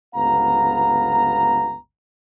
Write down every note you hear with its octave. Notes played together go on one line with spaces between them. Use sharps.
G1 C#2 B3 F5 A#5